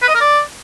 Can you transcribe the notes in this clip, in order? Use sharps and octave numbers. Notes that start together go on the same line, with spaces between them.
B4
D#5
A#4
D5